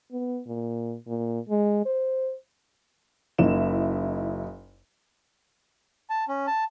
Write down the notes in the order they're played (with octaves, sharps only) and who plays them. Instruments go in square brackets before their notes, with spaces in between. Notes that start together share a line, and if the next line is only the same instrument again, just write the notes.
[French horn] B3
A#2
A#2
G#3
C5
[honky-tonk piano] F#1 D#4 E4 E7
[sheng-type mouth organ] A5
C#4
A5